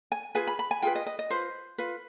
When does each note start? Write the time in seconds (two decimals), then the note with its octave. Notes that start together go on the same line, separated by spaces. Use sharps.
0.12 G#5
0.35 F4 G#4 B4 G#5
0.47 B5
0.59 B5
0.71 G#5
0.82 F4 G#4 B4 G5
0.95 D#5
1.06 D#5
1.19 D#5
1.30 F4 B4 C5
1.78 F4 B4